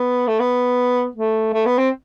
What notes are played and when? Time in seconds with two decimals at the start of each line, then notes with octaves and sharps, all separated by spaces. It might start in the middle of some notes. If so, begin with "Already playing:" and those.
Already playing: B3
0.27 A3
0.40 B3
1.15 A3
1.53 A3
1.66 B3
1.78 C4